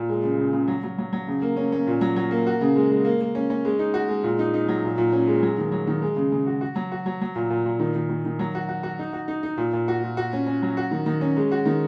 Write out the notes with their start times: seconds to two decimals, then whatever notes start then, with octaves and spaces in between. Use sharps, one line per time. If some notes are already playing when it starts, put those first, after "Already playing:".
Already playing: A#2
0.09 G#3
0.23 C#3
0.38 C#3
0.53 C#3
0.68 F#3
0.83 F#3
0.98 F#3
1.13 F#3
1.28 C#3
1.42 A#3
1.57 C#4
1.72 C#4
1.87 A#2
2.01 F#3
2.16 F#3
2.31 A#3
2.47 F#4
2.61 C#3
2.76 G#3
2.91 G#3
3.05 A#3
3.21 A#3
3.35 C#4
3.50 C#4
3.65 G#3
3.79 D#4
3.94 F#4
4.09 G#3
4.24 A#2
4.39 D#4
4.54 D#4
4.69 F#3
4.84 A#2
4.98 A#2
5.12 C#4
5.27 G#3
5.43 F#3
5.58 D#3
5.72 F#3
5.87 D#3
6.02 G#3
6.16 C#3
6.32 C#3
6.46 F#4
6.61 F#4
6.76 F#3
6.92 F#4
7.06 F#3
7.21 F#3
7.36 A#2
7.50 A#2
7.66 A#2
7.79 D#3
7.95 D#3
8.09 D#3
8.25 D#3
8.39 F#3
8.55 F#4
8.69 F#4
8.83 F#4
8.99 D#4
9.13 F#4
9.28 D#4
9.43 D#4
9.57 A#2
9.73 A#2
9.88 F#4
10.03 A#2
10.17 F#4
10.33 C#4
10.47 C#4
10.62 F#3
10.77 F#4
10.91 D#3
11.06 D#3
11.21 C#4
11.37 G#3
11.51 F#4
11.66 D#3